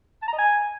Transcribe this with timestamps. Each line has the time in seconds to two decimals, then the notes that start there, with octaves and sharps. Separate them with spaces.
0.22 A5
0.28 A#5
0.33 D#5
0.38 G#5